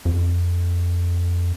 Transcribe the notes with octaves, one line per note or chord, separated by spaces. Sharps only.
F2